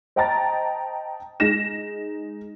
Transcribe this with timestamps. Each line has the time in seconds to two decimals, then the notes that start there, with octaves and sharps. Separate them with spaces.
0.16 C5 D#5 G5 A5 A#5 A6
1.40 G#3 D#4 A#6 E7